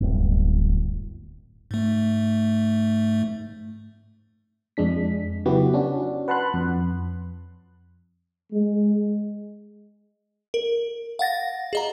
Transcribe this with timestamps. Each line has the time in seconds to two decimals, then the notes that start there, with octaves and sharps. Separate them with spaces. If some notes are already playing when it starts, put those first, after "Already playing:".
0.01 D1 G1
1.71 G#2 A3
4.77 F2 G#3 D4 B6
5.46 C#3 F#3 B3 E4 F#4 G4
5.74 C#4 D4 F#4
6.28 B4 F#5 A5 B5 C6 F#6
6.54 F2
8.52 G#3
10.54 A#4
11.19 F5 F#5 A6 A#6
11.73 G#4 D#5 A#5